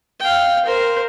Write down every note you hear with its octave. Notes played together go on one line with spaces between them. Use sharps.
F5 G5
A#4 C5